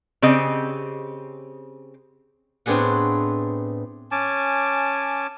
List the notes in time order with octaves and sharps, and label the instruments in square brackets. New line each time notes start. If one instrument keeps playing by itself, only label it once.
[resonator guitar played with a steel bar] C#3 C4 G4 D#5
[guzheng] A2 B3 C4 D4 G#4 F#5
[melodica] C#4 G#5 A5 D6